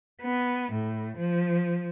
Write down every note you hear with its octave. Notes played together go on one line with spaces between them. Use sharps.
B3
A2
F3